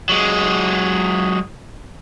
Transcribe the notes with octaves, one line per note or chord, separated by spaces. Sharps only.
F#3 G#3